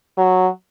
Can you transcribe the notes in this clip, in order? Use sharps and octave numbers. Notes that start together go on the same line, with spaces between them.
F#3